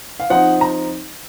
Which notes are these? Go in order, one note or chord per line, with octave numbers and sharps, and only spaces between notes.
F5
F3 C4 D#4 F#5
A#5